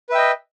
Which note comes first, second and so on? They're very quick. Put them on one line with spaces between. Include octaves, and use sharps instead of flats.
B4 E5 G5 D#5